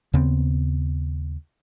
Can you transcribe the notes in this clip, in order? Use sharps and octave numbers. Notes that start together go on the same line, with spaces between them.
D#2 C#3 B3 C4